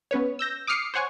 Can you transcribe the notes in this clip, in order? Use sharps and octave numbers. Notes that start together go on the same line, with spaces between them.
B3 C#4 B4 C#5
E6 G6 A#6
D6 D#6 F6 C7 C#7
C5 C#5 F#5 G#5 C#6